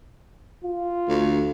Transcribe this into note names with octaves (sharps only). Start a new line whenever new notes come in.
F4
D2